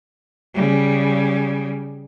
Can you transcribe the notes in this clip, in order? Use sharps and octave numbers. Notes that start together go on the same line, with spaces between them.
C#3 G3